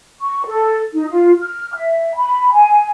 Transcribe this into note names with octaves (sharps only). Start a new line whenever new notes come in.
C#6
A4
D#4
F4
F6
E5
B5
G#5